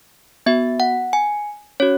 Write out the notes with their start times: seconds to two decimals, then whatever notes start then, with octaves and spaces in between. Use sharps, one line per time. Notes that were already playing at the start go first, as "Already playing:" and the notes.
0.46 B3 F#4 E5
0.80 F#5
1.13 G#5
1.80 C#4 F#4 C#5